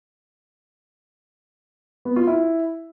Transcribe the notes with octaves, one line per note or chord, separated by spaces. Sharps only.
B3
F4
E4